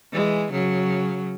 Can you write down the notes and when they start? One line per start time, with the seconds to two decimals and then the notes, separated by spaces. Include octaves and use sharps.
0.13 E3 G#3
0.52 C#3 F#3